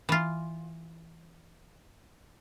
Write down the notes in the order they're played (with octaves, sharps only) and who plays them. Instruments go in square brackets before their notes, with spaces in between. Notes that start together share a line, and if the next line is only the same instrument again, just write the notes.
[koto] E3 F4